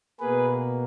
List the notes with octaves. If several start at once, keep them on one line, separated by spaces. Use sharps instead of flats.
B2 A#3 G#4 B4